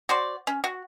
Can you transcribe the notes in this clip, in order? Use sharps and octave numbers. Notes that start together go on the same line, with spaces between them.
F#4 C5 D5
C#4
F#4